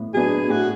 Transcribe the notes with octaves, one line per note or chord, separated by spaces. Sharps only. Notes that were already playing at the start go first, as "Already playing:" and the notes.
Already playing: A2 B3
F#3 B3 D4 G#4
A2 F#4